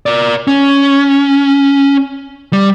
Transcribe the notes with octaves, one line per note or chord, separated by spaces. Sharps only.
A#4 D5
C#4
G3